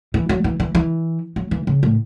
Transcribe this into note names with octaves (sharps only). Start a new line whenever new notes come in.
E3
F#3
E3
E3
E3
F#3
E3
C#3
A2